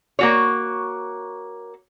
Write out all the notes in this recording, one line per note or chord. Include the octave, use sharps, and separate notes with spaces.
A#3 F#4 C#5